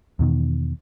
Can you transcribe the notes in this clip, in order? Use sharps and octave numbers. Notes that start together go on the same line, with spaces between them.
E2 B2 D#3